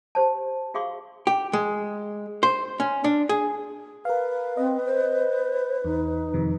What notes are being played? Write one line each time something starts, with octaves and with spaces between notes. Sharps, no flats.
G4 C5 A5
F#4 G#4 F5 C6 C#6
G4
G#3
C5
C#4
D4
G#4
A#4 B4 F5
C4 D#5
C5
E2 D#4
F2 C3 D#3